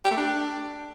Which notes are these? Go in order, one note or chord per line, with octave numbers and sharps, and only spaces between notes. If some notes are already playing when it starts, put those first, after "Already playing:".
G4
A3
D4